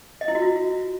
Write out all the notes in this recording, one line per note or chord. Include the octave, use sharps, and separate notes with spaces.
D#5
E4
F#4
F4